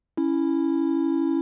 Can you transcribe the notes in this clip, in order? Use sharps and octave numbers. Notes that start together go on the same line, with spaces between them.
C#4 E4